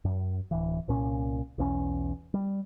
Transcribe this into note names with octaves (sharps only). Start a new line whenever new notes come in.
F#2
D1 E3
C2 A#2 C#4
B1 E2 C4 C#4
G3